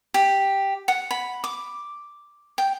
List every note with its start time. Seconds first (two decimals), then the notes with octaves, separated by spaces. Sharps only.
0.14 G4
0.88 F#5
1.11 B5
1.44 D6
2.58 G5